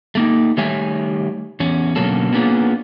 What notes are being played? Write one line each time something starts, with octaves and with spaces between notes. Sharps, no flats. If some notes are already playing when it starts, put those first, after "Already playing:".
A3 A#3 D#4
D#3 G3 A3 C#5 E5 G#5
E2 C#4
B2 D3 F#3 A#3 C#4 A4
A#3 B3 C#4 D4 F4 G#4